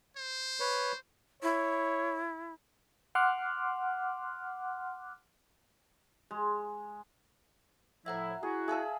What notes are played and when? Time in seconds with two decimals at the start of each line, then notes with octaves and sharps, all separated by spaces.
0.17 C5
0.60 B4 C#5
1.43 E4 C#5
3.15 F#5 C6 D6 F6 F#6
6.31 G#3
8.06 A2 F3 E4 E5 F#5 A#5
8.43 E4 F#4 G#4
8.68 G#4 E5 F5 A5 E6